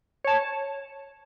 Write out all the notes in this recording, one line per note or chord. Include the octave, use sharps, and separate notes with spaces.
C#5 A5